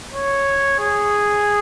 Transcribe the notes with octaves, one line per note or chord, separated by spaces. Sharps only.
C#5
G#4